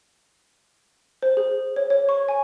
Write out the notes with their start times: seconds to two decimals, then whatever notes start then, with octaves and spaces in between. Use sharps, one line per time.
1.23 C5
1.37 G#4
1.76 C#5
1.90 C#5
2.09 C#6
2.29 G#5